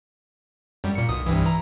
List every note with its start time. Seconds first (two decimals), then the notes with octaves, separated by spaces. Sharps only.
0.84 F#2 G3
0.95 A#2 C#7
1.09 B1 D#6
1.26 C2 G2 E3
1.43 E3 A#5